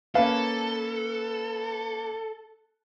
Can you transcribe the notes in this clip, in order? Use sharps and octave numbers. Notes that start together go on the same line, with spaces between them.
A#3 C#4 A4 B4 F5